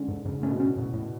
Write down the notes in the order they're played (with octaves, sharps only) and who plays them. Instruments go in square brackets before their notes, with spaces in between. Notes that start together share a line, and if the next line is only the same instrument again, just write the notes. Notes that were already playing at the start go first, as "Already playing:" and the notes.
Already playing: [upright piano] D3 G#3 [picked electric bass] C#4
[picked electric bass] G#2
[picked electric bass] G#2 [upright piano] C#3
[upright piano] A2 [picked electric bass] C#4
[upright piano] B2
[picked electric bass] C#4
A2
A2